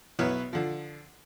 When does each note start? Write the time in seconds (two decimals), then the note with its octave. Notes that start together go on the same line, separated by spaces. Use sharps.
0.19 B1 B3 E4 B4 C#5 F6
0.53 D3 F3